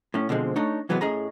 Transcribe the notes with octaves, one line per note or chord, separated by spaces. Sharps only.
A2 C#4
B2 D3 F3 G#3 C4
A3 D4 D#4 C#5
C3 E3 F#3 G#3 B3
A2 C#4 G#4 D#5 A#5